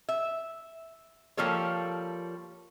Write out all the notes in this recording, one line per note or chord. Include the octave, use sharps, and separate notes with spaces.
E5
F3 G3 A#3 A4 C#5